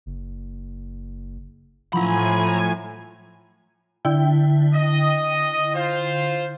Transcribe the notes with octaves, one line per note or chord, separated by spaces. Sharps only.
F#1
A2 F3 F#3 E4 G#5 A#5 B5
D3 E4 G5
D#5
F4 C5